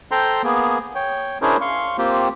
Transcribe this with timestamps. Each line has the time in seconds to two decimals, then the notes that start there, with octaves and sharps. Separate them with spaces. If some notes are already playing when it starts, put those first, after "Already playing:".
0.11 A4 C5 G5 A#5 C6
0.44 A#3 B3 G#4
0.95 C#5 G5
1.42 C#4 D4 E4 G#4 A#4 C5
1.61 F5 C6 C#6
1.98 A#3 C4 F4 G4 C5